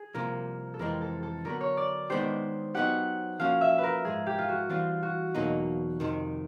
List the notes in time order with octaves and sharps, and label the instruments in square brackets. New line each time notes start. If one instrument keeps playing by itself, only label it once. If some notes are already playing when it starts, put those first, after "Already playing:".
Already playing: [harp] G#4
[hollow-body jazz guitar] C2 C3 F3 A#3 [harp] A#4
[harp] A4
[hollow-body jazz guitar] F2 C3 E3 G#3 C4 [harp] A#4
[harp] A4
A4
[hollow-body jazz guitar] D3 F#3 B3 [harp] A#4
[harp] C#5
D5
[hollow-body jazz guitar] D#3 G#3 B3 D4 G4 [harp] C5
[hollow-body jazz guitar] F#3 B3 D#4 G4 [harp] F#5
[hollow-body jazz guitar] F3 A#3 C#4 F#4 [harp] F5
[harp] E5
B4
A#4
[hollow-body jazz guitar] G#2 F3 G#3 [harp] G#4
[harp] G4
F4
F#4
[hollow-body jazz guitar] E3 G3 C4 [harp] F4
[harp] F#4
[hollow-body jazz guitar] E2 B2 F#3 A#3 D#4
F2 C3 D#3